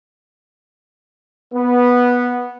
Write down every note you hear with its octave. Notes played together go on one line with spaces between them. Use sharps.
B3